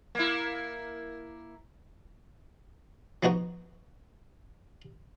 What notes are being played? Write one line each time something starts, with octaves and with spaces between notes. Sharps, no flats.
A#3 E4
F3 B3 D#4 F#4